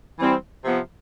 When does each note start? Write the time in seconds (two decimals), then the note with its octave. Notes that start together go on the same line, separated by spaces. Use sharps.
0.19 E3 G3 C4 E4
0.64 C3 F3 B3